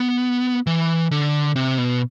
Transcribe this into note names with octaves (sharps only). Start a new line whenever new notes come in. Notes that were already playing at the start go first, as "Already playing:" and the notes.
Already playing: B3
E3
D3
C3
B2